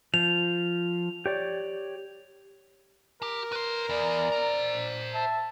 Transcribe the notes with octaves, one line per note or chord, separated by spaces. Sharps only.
F3 F7
G4 C#5 D5
G4 A#4
B4 C6
E2 D5
C5 A#5
E5 A5